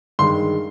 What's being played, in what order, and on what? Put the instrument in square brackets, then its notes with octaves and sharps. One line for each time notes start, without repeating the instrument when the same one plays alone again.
[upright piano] G2 D#3 G#3 C6